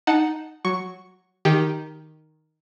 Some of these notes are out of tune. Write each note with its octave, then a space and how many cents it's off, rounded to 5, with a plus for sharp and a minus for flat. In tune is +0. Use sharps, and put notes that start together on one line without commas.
D#4 +0 F#5 +0 A5 +0
F#3 +0 C#6 +0
D#3 +0 G4 +0